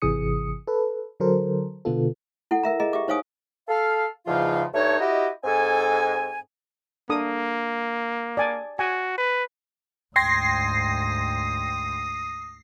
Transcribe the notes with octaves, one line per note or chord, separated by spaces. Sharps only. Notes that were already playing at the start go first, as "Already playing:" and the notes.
G#1 C3 E3 G#4 D#6 C#7
A4 B4
D3 F#3 A4 A#4 C5
B2 D3 B3 F4 A4
E4 A4 F#5
A#4 E5 A#5
G#4 D#5 A#5
G4 E5 D6
D#4 C5 C#5 F5 G#5 D#6
A4 F5
E2 G#2 C#3 F3 F4 F5
G2 A3 D#4 C#5
E4 F#4 G4 D#5
G#2 C4 A4 G#5
A#3 D4 A4 D#6
D5 G#5 A5
F#4 G#5
B4
D2 G#2 G5 C6 D#6 G#6 A#6 C7